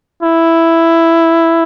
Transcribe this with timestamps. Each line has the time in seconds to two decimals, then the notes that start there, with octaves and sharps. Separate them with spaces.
0.23 E4